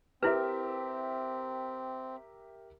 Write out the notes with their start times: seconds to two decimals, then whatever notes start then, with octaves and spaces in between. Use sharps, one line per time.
0.23 C4 E4 G4 A#4 B4 E5